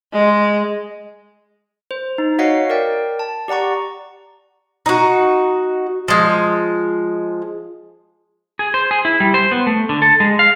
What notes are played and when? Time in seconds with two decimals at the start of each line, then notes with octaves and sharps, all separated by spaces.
0.13 G#3
1.91 C5
2.18 D#4
2.39 F#4 C#5 D#5 F5 F#5 C7
2.70 A#4 D5 G5
3.19 A5
3.48 G4 D5 F#5 A#5 C#6
4.86 D#4 F#4
6.08 F3 G#3
8.59 G#4
8.74 C5
8.91 G#4
9.05 E4
9.20 G3
9.34 C5
9.51 B3
9.67 A3
9.89 D3
10.02 A4
10.20 G#3
10.39 F5